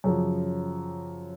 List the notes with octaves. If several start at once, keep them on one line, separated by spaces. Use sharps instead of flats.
F#2 C#3 F3